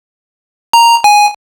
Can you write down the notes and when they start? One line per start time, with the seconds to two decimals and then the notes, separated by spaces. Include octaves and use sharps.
0.73 A#5
1.04 G#5